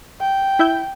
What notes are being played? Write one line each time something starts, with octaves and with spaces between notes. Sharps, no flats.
G5
E4 E5 G6